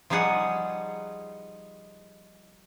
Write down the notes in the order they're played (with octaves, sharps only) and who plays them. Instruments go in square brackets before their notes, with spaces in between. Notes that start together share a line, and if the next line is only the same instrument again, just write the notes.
[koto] F3 G3 D#4 G#4 F#5